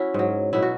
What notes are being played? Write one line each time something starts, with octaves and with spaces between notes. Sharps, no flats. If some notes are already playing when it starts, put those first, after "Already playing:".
Already playing: C#4 E4 F#4
G#2 F#3
B2 F#3 E4
F#4